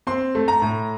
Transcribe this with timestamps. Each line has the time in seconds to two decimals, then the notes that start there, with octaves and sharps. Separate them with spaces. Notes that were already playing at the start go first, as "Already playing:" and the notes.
0.07 C4 C6
0.35 A3
0.48 A#5
0.62 A2